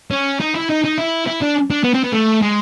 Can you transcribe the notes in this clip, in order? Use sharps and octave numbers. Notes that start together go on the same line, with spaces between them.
C#4
D#4
E4
D#4
D#4
E4
E4
D4
D4
B3
C4
B3
A3
G#3